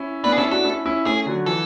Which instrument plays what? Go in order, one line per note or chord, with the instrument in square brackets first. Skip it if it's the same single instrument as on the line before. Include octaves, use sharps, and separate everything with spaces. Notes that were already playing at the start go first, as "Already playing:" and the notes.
Already playing: [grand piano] C#4 E4
[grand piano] B3 D4 [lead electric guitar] B4
[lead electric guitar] G#4
[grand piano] C#4 E4 [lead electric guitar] A4
[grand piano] D4 F#4 [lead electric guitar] A4
[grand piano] C#4 E4
C#4 E4
[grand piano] A3 C#4 [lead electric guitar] G#4
[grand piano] D3 F#3
[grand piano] E3 [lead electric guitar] A4